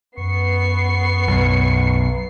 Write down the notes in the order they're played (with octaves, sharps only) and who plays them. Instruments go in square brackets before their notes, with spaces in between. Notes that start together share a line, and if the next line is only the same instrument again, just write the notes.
[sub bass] F#2 [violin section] B3 C7 [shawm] C#6
[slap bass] B1